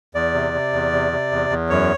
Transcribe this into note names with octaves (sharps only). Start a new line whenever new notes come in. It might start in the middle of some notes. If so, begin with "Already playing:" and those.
E2 D5
C3
C3
E2
C3
C3
E2
E2
F#2 C#5